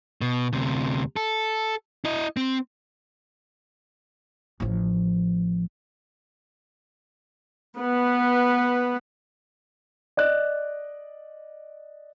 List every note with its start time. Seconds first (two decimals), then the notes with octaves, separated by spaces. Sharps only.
0.21 B2
0.53 D2 C3
1.16 A4
2.05 E4 D#5
2.37 C4
4.60 A1 F3
7.78 B3 B4
10.17 D5 D#5 F#6